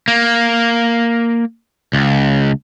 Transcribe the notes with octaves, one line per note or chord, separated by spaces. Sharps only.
A#3
C#2